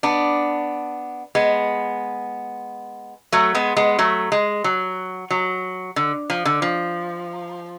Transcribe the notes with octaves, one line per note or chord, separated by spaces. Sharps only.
B3 D4
G#3 B3
F#3 A3
G#3 B3
G#3 B3
F#3 A3
G#3
F#3
F#3
D3
F3
D3
F3